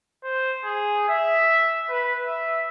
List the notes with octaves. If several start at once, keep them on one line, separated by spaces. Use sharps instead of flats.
C5
G#4
E5
B4
E5